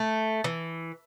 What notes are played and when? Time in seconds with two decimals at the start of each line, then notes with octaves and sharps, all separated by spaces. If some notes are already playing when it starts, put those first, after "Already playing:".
Already playing: A3
0.44 E3